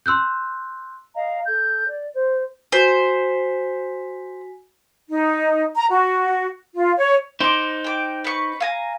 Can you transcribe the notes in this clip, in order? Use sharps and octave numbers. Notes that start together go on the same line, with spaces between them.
C6 E6 F#6 G6
D#5 F5 A#5
A4 G6
D5
C5
F#4 C5 G#5 B6
D#4
A#5
F#4
F4
C#5
D#4 C5 C6 D6
G5 D6
B4 C#6
F5 G#5 A#5